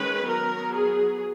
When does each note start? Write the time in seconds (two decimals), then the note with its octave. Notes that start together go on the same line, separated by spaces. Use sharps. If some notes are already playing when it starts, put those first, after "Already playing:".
Already playing: D#3 G#3 C#4 B4
0.27 F#3 B3 A#4
0.72 G#4